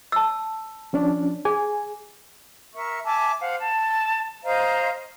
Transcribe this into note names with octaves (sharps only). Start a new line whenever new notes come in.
A5 E6
F3 C#4 D4
G#4 G#5
A#4 E5 C#6
E5 G#5 A5 D6
C5 F5 F#5
A5
C5 D#5 F5 A#5